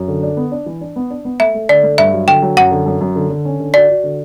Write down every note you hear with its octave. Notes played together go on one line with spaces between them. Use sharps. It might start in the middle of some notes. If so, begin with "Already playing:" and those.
Already playing: F#2
D3
D4
B3
D4
E3
D4
B3
D4
B3
A3 E5
A3
D3 D5
A3
G2 E5
F#3
D3 G5
F#3
F#2 F#5
D3
F#2
F#2
D3
D3
C#4
D3
F#4 D5
F#4
D3